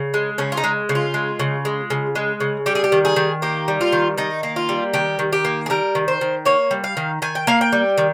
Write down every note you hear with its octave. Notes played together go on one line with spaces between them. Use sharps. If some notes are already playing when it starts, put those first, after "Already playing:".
Already playing: C#3
G#3
C#3 C#4
F4
D#4
G#3
C#3
F4
G#3
C#3
G#3
C#3
G#3
C#3
G3 G4
G#4
G4
D#3
G#4
D#3
A#3 G4
G3
F4
D#3
D#3 D#4
A#3
F4
G3
D#3 G4
D#3
G4
A#3
G#4
G3 A#4
D#3
C5
D#3
A#3 C#5
G3
F5
D#3
D#3 G#5
G5
A#3 F5
G5
G3
D#3